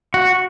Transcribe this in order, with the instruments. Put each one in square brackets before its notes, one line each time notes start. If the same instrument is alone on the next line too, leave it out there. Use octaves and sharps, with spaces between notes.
[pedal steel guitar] F#4